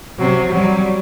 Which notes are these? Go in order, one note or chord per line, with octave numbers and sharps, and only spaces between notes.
C3 F#3
F#3 G3